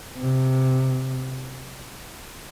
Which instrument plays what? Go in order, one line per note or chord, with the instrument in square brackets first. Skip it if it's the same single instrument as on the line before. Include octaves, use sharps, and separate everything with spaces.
[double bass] C3